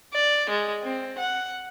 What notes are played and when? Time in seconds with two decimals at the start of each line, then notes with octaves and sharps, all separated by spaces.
0.14 D5
0.50 G#3
0.83 C4
1.18 F#5